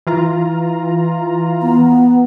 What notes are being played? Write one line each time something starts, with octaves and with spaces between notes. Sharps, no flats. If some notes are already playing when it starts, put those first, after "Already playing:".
E3 F4 A#5
B3